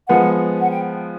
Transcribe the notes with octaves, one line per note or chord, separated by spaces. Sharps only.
F3 G#3 B3 F#5
F#5
G5